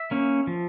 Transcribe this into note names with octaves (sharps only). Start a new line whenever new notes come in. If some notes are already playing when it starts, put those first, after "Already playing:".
Already playing: E5
A#3 C#4
F3